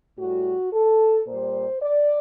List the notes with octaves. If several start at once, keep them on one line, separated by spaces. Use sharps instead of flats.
A2 G3 F#4
A4
A#2 G3 C5
D5